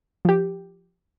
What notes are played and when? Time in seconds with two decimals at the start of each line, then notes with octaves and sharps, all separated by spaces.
0.25 F3 G4